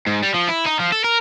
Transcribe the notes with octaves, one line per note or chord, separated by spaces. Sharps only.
G#2
G3
F3
E4
D#4
F3
A4
A#4